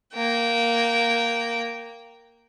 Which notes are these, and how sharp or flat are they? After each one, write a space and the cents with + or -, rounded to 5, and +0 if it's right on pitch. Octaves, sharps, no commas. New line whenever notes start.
A#3 +0 G5 -20